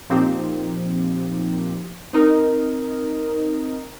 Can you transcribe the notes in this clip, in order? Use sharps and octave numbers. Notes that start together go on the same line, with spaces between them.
A#2 F3 C4 D#4 G4
C4 D#4 A#4 D#5